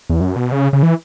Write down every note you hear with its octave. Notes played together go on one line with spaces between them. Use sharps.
E2
F#2
B2
C#3
C#3
E3